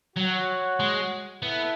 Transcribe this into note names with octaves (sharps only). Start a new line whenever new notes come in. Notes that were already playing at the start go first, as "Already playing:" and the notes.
F#3 F#4 C#5 F#5
G#3
B3 E4 A4